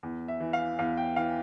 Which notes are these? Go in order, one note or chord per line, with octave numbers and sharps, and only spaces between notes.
E2
E5
E3
F5
E2 F5
G5
E3 F5